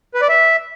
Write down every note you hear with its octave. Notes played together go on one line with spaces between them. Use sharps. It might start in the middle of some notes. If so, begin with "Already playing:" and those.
B4
D5
E5